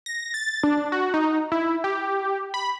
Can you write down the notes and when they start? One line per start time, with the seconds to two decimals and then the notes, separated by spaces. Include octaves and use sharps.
0.06 A#6
0.34 A6
0.63 D4
0.92 F#4
1.14 D#4
1.52 E4
1.84 G4
2.54 B5